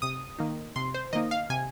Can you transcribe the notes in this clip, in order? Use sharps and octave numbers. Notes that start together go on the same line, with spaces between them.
C3 D#6
D#3 A#3 D#4
C3 C6
C5
D#3 A#3 D#4 D#5
F5
C3 G#5